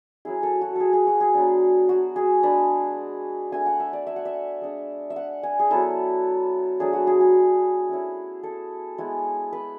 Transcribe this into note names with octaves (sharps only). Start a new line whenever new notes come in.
F#3 C#4 E4 G#4
A4
F#4
G#4 A4
G#4
F#4
G#4
F#3 B3 D4
F#4
G#4
G#3 D4 B4
A3 D4 G#5
F#5
E5
D5
E5
F#5
E5
G#3 D4
E5
F#5
G#5
G#4
F#3 B3 E4 A4
F#3 A3 D4 G#4
F#4
G#4
G#4
A3 C#4 E4
A4
G#3 B3 E4
B4